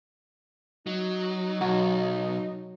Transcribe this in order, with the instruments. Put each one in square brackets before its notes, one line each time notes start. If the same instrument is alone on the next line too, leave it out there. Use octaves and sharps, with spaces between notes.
[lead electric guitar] F#3 [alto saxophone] D#4
[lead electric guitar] B1 [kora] F#3